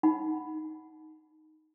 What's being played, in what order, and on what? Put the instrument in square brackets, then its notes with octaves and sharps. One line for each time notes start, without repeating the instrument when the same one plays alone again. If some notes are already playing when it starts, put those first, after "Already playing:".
[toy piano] D#4 F#5 B5